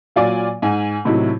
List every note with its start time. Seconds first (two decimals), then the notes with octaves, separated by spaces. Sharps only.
0.16 A#2 F#3 F4 D5 G#5 D6
0.62 G#2 G#5
1.05 A2 C3 F#3 D#4 E4